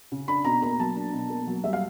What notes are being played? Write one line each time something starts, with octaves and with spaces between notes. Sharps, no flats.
C#3
D4 B5
B2 A#5
A#3 A#5
F#3 A5
D4
B2
A#3
F#3
G3 E5
F5